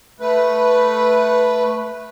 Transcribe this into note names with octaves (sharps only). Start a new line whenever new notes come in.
A3 B4